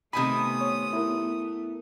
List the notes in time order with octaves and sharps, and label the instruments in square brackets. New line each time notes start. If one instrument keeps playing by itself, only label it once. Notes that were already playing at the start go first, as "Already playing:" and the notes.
[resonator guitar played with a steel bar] C3 D#3 G#5 [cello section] A3 B3 [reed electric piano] B5 [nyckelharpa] D#6
[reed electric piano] C#5
E4 A#4